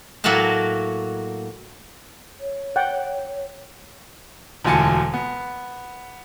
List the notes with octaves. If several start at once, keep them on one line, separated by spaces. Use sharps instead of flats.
A2 F#3 A#3 F#4 A#4 A5
C#5
F#5 G5
E1 D2 F4 G#5 A5 C#7
B3